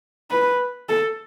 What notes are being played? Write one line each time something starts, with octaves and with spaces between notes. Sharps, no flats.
B4
A4